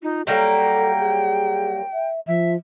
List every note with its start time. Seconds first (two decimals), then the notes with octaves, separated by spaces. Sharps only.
0.03 D#4 F4
0.27 F#3 G3 A#3 A4 G5
1.00 G#4
1.93 E5
2.27 F3 E5